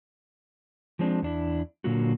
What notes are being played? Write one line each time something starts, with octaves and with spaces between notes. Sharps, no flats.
F3 G#3 C4 D4
E2 D4 E4
A#2 D3 F#3 A#3 F4 F#4